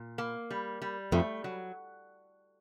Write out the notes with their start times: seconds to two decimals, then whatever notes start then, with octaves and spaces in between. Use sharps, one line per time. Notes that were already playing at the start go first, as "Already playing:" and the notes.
Already playing: A#2
0.18 A#3
0.51 G3
0.82 G3
1.12 F2 A3
1.44 F#3